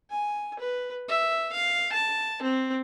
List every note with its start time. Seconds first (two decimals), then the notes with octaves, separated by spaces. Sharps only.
0.10 G#5
0.59 B4
1.09 E5
1.53 F5
1.92 A5
2.42 C4